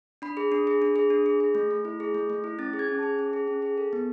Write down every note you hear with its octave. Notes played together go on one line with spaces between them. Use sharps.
D4 B5
G#4
D4
G#4
D4
G#4
D4
G#4
G#4
A3
A3
E4
G#4
A3
A3
E4
C#4 A6
G#4
G#6
C#4
G#4 A5
C#4
G#4
C#4
G#4
A4
B3